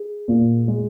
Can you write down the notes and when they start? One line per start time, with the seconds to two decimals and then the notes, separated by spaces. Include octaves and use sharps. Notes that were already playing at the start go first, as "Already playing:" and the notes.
Already playing: G#4
0.28 A#2
0.68 G#3